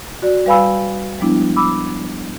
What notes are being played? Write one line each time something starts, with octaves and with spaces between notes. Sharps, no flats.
F#4 D5
G3 B4 F5 G#5 B5 E6
F3 G3 G#3 B3 D4 E4
B5 D6 E6